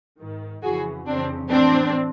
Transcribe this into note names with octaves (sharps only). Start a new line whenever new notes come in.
G#2 D#3
F2 C#3 E3 F#4 G#4
F2 C#3 E3 C4 D4
A2 E3 C4 D4